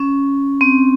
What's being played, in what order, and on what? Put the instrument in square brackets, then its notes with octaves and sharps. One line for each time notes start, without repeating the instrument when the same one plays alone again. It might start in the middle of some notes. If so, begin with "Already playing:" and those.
Already playing: [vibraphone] C#4
C4